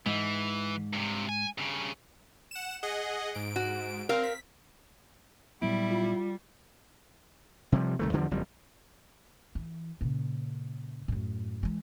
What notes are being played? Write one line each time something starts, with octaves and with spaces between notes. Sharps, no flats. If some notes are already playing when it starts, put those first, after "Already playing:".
G#2 E3
G2 C3
G#5
G2 C#3
F#5 E7
G#4 D#5 F#5
G#2 D7
F#4
C4 A#4 F5
B6
A#2 F#3 G3 B3 E4 D7
F4
C3 F3 G3
C2 D#3 A3
E2 D3 F3 G3
F#1 F2 G3
E3
A#2 C#3
F#2 A2
E3 G#3